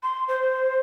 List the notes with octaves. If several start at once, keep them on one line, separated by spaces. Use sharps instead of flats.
C6
C5